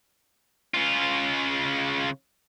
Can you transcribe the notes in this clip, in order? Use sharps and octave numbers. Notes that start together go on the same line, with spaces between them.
C#3 F4